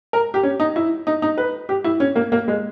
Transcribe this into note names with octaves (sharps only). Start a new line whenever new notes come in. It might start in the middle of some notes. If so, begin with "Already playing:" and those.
A#4
G4
C#4
D#4
E4
D#4
D#4
B4
G4
E4
C#4
A#3
A#3
G#3